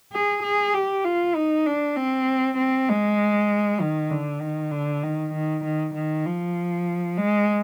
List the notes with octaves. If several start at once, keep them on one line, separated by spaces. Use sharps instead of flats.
G#4
G#4
G4
F4
D#4
D4
C4
C4
G#3
D#3
D3
D#3
D3
D#3
D#3
D#3
D#3
F3
G#3